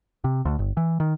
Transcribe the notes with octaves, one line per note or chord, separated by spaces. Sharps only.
C3
D2
G1
E3
D#3